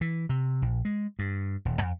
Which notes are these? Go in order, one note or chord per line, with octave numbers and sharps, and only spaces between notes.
E3
C3
A#1
G#3
G2
D#1
F2